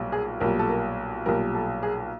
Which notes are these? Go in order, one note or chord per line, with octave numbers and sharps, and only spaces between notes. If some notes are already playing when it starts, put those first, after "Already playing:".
Already playing: B1 A#2 G3
G#4
B1 A#2 G3 A#4
A4
A#4
B1 A#2 G3 A#4
A4
G#4